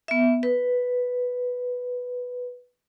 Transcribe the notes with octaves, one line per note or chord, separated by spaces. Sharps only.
B3 E5
B4